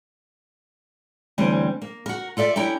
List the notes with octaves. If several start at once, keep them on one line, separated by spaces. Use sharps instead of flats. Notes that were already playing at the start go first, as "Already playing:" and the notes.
D2 E3 G3 C4 C#4
A#3
F#4 A#4
F4 A4 D5 E5
C#4 E4 G4 A#5